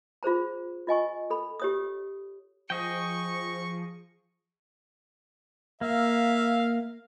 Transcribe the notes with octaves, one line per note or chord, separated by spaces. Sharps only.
F4 G#4 C5 A#5
F4 D#5 G#5 C#6
A4 B5
G4 C#5 D#6
F3 G#4 D#5 G5 C#6
A#3 E5 F5